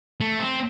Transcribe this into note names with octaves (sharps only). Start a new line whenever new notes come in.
A3
C4